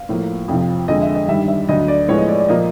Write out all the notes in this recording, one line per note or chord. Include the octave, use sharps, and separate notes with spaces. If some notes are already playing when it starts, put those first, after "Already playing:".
Already playing: F5
A2 F3 A#3
F2 C3 F3
F2 D3 F3 G#3 D#5
E5
D#5
G2 D#3 G3 E5
E5
D2 D3 F#3 D#5
D5
A2 F3 G#3 B3 C#5
D#5
D5
D5
A#2 F3 A#3 D#5